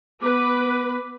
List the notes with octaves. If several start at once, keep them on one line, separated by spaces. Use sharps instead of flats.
B3 B4 D6